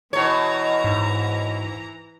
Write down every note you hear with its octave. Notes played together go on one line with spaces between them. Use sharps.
B2 E3 C#5 A#5
G#2